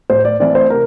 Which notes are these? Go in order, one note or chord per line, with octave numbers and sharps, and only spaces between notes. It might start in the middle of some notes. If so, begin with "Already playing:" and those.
A2 C5
D5
E3 A3 C4 D5
C5
C3 A#4